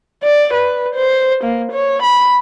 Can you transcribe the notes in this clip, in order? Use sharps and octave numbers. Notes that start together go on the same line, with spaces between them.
D5
B4
C5
A#3
C#5
B5